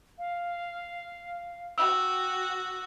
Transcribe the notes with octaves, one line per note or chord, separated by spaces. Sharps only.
F5
F#4 G5 E6